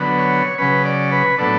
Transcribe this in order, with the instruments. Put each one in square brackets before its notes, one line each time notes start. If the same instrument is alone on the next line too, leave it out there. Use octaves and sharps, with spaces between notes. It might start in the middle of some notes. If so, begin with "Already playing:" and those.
Already playing: [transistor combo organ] D3 F#3 B3
C#5
C#3 F#3 C#4 B4
D5
B4
A2 F#3 B3 D4 A4